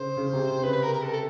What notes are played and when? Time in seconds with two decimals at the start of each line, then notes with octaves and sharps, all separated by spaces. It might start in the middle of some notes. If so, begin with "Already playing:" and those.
Already playing: C#3 C5
0.17 C#3
0.33 C3
0.62 C#3 B4
0.73 B4
0.83 A#4
0.93 A#4
1.03 A4
1.13 A4